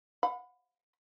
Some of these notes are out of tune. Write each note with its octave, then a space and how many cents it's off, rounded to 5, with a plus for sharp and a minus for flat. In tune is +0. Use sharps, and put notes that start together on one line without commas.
F#5 -25 B5 +20